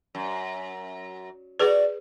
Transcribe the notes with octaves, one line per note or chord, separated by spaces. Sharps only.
F#2
F#4 G#4 B4 D5